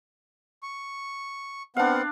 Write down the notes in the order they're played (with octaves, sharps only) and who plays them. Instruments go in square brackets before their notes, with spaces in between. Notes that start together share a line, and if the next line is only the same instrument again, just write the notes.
[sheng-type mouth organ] C#6
[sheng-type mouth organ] B3 C4 F#5 [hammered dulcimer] D4 F5